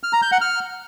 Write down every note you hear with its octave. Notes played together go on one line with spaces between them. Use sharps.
F6
A#5
G6
F#5
F6